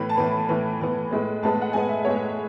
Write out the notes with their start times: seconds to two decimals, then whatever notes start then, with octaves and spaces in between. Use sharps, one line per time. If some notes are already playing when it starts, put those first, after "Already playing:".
Already playing: A2 E3 B3 B5
0.09 A5
0.17 A2 E3 B3 B5
0.49 A2 E3 B3
0.80 A2 E3 B3
1.11 A2 G#3 B3
1.42 A2 G#3 B3 A5
1.62 F#5
1.73 A2 G#3 B3 G#5
1.89 E5
2.05 A2 G#3 B3 C#5